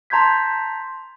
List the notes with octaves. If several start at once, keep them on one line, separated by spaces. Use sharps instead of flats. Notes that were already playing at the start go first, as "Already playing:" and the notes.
A5 A#5 C6 G6 G#6 B6